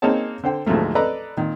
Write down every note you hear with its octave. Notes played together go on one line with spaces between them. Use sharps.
A#3 C4 D#4 G#4 C#5 A5
D3 C5 G5
D2 G#2 F3 F#3 A3 A#3
A4 B4 D5 D#5 A#5
A#2 D#3